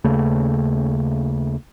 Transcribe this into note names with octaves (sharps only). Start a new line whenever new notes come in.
D#2 C#3 A3